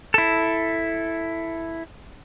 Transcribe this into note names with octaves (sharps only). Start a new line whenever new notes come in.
E4 A4